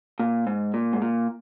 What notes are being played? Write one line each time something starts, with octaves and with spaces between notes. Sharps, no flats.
A#2
G#2
A#2
G#2
A#2